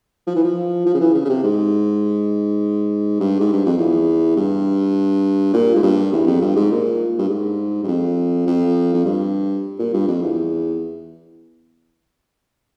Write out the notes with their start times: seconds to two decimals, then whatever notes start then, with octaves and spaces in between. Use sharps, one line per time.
0.27 F3
0.35 E3
0.44 F3
0.86 F3
0.94 C#3
1.00 E3
1.15 C#3
1.25 C#3
1.29 C3
1.44 G#2
3.20 G2
3.40 G#2
3.53 G2
3.66 F2
3.78 E2
4.37 G2
5.54 A#2
5.75 G#2
5.83 G2
6.13 E2
6.27 F2
6.42 G2
6.56 G#2
6.71 A#2
7.19 G2
7.29 G#2
7.84 G2
7.88 F2
8.47 F2
8.94 F2
9.05 G2
9.79 A#2
9.93 G2
10.08 F2
10.22 E2